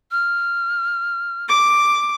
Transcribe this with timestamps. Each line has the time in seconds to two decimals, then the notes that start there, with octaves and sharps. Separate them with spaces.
0.11 F6
1.49 D6